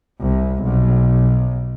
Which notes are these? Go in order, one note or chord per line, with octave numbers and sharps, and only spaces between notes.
C2
B1